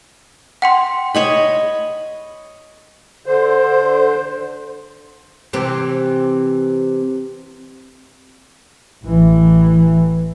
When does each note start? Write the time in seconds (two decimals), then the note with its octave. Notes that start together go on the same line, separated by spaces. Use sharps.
0.62 F#5 G5 C6
1.15 C#5 D#5 B5
3.26 D3 C5
5.53 C3 E3 C4
9.04 A1 E3